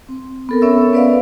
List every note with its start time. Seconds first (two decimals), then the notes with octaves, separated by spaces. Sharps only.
0.09 C4
0.49 B3 A4 A#4
0.62 B3 C#4 C#5 E5 E6
0.93 B3 B4 D5 E5 F5